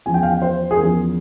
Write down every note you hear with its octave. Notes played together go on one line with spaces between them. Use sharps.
E2 C#3 F3 G#5
G5
F5
G5
C5
G#4
E2 C#3 F3 A#4